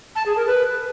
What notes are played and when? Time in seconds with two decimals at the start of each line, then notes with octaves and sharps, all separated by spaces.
0.15 A5
0.26 G#4
0.36 A#4
0.47 B4